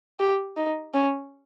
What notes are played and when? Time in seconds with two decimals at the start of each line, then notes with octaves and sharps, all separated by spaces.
0.20 G4
0.57 D#4
0.94 C#4